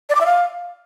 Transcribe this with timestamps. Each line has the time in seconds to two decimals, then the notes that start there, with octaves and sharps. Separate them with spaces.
0.10 D5
0.15 D6
0.21 E5
0.26 F5